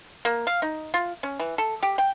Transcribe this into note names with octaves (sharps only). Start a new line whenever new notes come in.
A#3
F5
D#4
F4
C#4
E3
A4
G4
G5